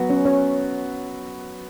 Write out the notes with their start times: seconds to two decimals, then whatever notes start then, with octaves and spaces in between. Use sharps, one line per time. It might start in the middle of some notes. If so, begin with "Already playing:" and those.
Already playing: F#3 B3 F#4
0.09 C#4 C#5
0.25 C#4 C#5